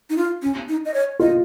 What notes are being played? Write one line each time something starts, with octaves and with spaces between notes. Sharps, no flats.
D#4
F4
C#4
D#4
D#5
C#5
F4 D#5